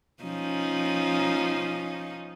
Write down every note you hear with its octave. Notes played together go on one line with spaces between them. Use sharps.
F3 C#4 D#4